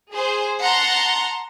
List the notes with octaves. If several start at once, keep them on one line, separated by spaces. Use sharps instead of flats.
G#4 C5
F#5 A5 A#5 C6